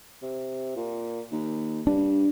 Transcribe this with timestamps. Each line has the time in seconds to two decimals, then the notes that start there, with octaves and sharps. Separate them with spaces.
0.22 C3
0.76 A#2
1.32 D#2
1.87 G2 D4